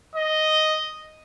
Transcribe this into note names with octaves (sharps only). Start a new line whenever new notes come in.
D#5